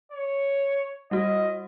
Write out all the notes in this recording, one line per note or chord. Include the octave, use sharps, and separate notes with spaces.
C#5
G3 F#4 D#5